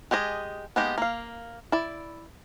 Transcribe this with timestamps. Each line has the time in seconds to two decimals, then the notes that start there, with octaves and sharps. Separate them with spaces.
0.11 G#3 G4 G#4 D#5
0.76 G#3 A#3 B3 D#4 G4
0.98 A#3 F5
1.72 E4 D5